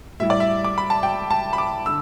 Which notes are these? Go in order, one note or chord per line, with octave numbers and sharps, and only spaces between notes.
A2 G3 E4 E5
D5
E5
D6
B5
A5
G5
A5
B5
D6
D3 E6